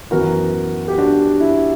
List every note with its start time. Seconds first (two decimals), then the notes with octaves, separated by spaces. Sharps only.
0.11 F#2 E3 B3 F#4 A#4
0.88 G4
0.98 D4 F#4
1.40 E4